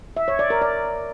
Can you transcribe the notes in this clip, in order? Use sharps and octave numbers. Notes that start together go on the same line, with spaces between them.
E5
C#5
D5
A#4
D5